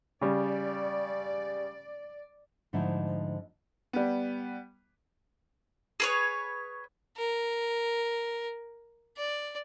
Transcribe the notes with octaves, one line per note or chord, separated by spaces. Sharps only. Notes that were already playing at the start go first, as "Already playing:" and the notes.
C#3 G3 D5
G#2 D3 F3 A3 D#4 E4
G3 B3
G#4 B4 C#5
A#4
D5